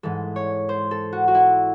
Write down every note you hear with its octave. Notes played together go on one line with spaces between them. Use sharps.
G#2 E3 G#3 A4
C#5
C5
A4
F#4
F#4
E4